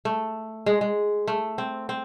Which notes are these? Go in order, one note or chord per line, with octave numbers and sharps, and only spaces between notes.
A3
G#3
G#3
A3
C4
C4